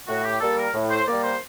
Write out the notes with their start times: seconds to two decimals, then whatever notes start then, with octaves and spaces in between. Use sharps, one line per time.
0.08 A2 F#4
0.24 G4
0.41 G3 A#3 A4
0.58 A#4
0.74 A2
0.90 C5
1.07 G3 A#3 D5
1.24 C5